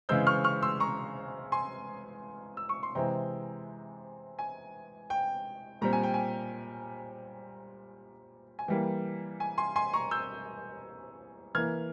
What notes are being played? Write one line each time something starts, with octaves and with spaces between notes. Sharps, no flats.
C#3 E3 G#3 C4 E6 G6
C#6 F6
C#6 F6
C6 E6
A#5 C#6
G#5 C6
E6
C#6
C6
C3 E3 G#3 C4 G5 A#5
G#5
G5
A#2 G3 C4 A#5
G#5
G5
G#5
G#5
E3 G3 A#3 G5
G#5
G#5 C6
G#5 C6
A#5 C#6
E6 G6
E3 A#3 F6 G#6